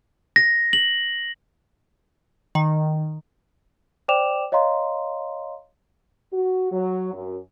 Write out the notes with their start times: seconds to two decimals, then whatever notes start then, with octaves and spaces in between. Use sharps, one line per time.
0.36 A#6
0.73 F#7
2.55 D#3
4.08 C5 D5 G5 D6 E7 F7
4.52 C#5 D#5 F5 A#5 C6
6.32 F#4
6.72 F#3
7.13 F#2